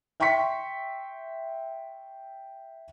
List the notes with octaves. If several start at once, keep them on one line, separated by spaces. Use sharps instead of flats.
E5 G5 C6 C#6 B6 C#7